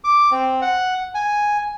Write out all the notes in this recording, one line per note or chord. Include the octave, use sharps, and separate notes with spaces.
D6
C4
F#5
G#5